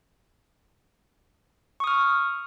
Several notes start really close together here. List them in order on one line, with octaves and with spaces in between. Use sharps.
C#6 D#6 F6